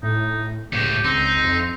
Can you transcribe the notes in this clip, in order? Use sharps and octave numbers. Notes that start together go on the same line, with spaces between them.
A2 D#4
C#2 A2 B3 G4
C#2 C4 D#4
F2